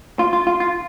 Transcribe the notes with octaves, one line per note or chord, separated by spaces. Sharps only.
F4
F4
F4
F4